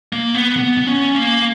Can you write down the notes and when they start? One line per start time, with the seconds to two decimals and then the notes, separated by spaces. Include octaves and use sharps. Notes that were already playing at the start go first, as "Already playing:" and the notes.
0.13 A#3
0.35 B3
0.56 B3
0.77 B3
0.87 C#4
1.15 A#3